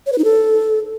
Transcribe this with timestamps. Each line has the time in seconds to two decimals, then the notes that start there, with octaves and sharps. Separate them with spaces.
0.06 C#5
0.12 B4
0.18 D#4
0.24 A4